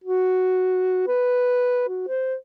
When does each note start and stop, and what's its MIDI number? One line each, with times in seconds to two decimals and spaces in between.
0.04 1.06 66
1.07 1.87 71
1.88 2.04 66
2.07 2.35 72